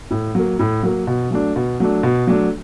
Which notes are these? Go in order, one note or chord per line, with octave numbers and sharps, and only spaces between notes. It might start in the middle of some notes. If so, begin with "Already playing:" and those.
A2
F#3 A#3
A2
F#3 A#3
B2
F#3 A3 D4
B2
F#3 A3 D4
B2
F#3 A3 D4